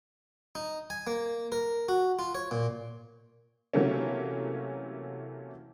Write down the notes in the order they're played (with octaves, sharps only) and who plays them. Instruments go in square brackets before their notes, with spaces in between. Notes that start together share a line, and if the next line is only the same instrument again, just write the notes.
[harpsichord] D#4
G#5
A#3
A#4
F#4
F4
C#5
A#2
[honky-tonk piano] C3 E3 F#3 A3 A#3 C#4